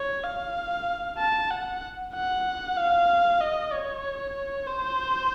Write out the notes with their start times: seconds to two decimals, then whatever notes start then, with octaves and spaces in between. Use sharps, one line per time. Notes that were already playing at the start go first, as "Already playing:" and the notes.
Already playing: C#5
0.24 F5
1.18 A5
1.50 F#5
2.14 F#5
2.76 F5
3.41 D#5
3.72 C#5
4.67 C5